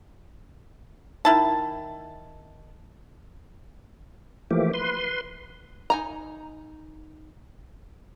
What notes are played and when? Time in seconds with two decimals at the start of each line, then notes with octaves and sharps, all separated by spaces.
1.25 D#3 E4 A5
4.51 E3 F3 A3 A#3 G4
4.74 B4 C6
5.90 D#4 G#5 A#5